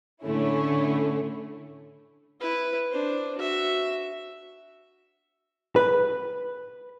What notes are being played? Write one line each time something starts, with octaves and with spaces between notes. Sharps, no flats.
A2 D3 A3 C#4 E4
E4 B4
D4 C5
F#4 E5
B4